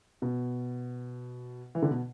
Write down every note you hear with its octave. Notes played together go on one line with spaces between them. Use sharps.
B2
E3
D3
B2